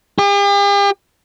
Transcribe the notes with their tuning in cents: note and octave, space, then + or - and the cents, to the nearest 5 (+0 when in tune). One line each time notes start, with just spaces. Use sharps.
G4 +45